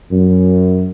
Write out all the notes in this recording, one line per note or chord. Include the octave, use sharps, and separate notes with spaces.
F#2